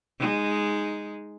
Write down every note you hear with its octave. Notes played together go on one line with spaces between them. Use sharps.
G#3 D#4